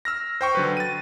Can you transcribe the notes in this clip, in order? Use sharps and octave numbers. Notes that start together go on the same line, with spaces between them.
E6 F6 A#6
C5 G5 C#6
D3 F#3 B4
A6 D#7